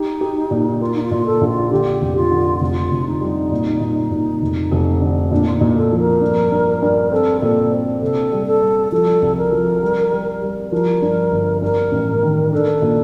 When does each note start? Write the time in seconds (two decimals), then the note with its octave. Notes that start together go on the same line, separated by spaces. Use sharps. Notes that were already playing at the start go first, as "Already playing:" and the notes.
Already playing: D#4 G4
0.21 G4
0.51 A#2
0.81 A#3 F4
0.95 D#4
1.03 F4
1.11 A#2
1.26 A4
1.41 A#1
1.48 F4
1.71 D3 G4
2.01 F1
2.16 F4
2.31 D3
2.61 F1 F4
2.91 F1
3.06 D#4
3.21 G3
3.51 A#2
3.81 A#2
4.11 A#2
4.42 F1
4.71 F1
5.01 D3
5.31 A#2 D4
5.47 F4
5.54 D#4
5.61 A#2
5.76 A4
5.92 F3
5.99 A#4
6.21 G2
6.52 G2
6.82 G2
7.12 C4 A4
7.42 A#2 A4
7.72 C4
8.01 C3 A4
8.32 G3
8.47 A4
8.61 G3
8.92 F3 A4
9.22 C2
9.37 A#4
9.52 F3
9.82 G3
10.12 G3
10.42 G3
10.72 F3 A#4
11.02 G2
11.32 G1
11.62 G2 A#4
11.92 A1
12.22 D#3
12.52 D4 A4
12.82 A#2